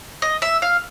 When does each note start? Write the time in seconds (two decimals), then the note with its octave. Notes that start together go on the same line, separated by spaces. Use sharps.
0.22 D#5
0.42 E5
0.62 F5